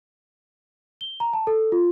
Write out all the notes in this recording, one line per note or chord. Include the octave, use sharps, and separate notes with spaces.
G7
A#5
A5
A4
F4